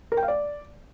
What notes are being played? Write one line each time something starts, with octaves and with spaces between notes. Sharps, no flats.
A#4
G5
F5
D5